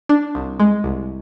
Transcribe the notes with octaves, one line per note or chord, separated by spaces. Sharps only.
D4
C2
G#3
C2